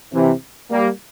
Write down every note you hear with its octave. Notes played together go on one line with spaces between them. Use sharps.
C3 E3
G3 A#3